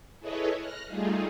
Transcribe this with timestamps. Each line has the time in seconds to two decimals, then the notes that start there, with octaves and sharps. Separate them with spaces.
0.19 E4 G#4 A4 B4 C#5 D#5
0.59 F6 F#6 A#6
0.87 G3 A3 D#4 F4 G#4